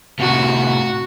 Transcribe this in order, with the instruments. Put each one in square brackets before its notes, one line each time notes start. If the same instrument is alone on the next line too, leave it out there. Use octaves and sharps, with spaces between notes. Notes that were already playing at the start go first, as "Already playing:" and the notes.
[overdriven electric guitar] A2 C3 [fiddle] F#4